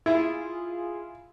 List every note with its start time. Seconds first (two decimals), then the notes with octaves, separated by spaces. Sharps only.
0.06 E4 F4 G#4